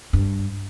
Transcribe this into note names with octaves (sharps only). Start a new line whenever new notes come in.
G2